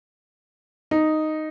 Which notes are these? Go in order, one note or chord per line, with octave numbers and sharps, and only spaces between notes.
D#4